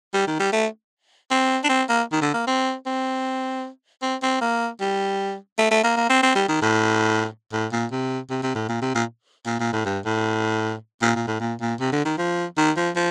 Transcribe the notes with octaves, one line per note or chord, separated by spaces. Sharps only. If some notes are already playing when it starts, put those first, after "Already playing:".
G3
D#3
G3
A3
C4
D4
C4
A#3
D#3
D3
A#3
C4
C4
C4
C4
A#3
G3
A3
A3
A#3
A#3
C4
C4
G3
D#3
A2
A2
A#2
C3
C3
C3
A2
A#2
C3
A#2
A#2
A#2
A2
G2
A2
A#2
A#2
A2
A#2
A#2
C3
D3
D#3
F3
D#3
F3
F3